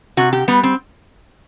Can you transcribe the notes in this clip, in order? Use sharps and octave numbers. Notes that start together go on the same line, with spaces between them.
C3 F#4
G4
G3 B3
C4